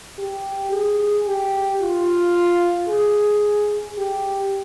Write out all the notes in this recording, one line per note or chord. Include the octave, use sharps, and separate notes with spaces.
G4
G#4
G4
F4
G#4
G4